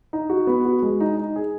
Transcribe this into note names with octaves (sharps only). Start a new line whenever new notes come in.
D#4
F#4
B3
F#4
G#3
D#4
D#4
G#4